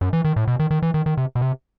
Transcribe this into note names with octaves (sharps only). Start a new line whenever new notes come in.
F#2
E3
D#3
A2
B2
D#3
D#3
E3
D#3
D#3
C3
B2
C3